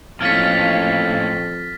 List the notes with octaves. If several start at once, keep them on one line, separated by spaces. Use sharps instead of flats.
F2 A2 A#3 C#4 F5 F6 A6 B6